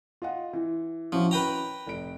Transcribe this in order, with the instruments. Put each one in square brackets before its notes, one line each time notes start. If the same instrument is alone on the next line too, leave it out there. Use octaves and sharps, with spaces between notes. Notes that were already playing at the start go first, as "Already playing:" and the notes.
[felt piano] F4 D#5 F#5
E3
[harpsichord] F3 [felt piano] C#4 E4 F#4
[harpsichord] B4 G5 A#5
[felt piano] F1 D7